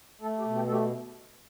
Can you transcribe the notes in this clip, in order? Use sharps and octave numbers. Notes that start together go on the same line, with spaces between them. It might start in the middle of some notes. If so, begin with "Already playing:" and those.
A3 A4
G4
B2
G4
A3 A4
G4